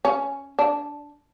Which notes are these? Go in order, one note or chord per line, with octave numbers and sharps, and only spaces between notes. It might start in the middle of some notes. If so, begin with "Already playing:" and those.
C#4
D4